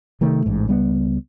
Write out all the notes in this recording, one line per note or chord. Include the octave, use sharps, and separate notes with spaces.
C3 D#3 A3
A1 G#2
C#2 G3 B3